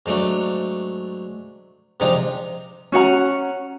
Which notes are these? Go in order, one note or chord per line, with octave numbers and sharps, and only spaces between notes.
G#2 F#3 A3 D4
G#2 C3 F3 D4 D#4
C#4 F#4 F#5 A#5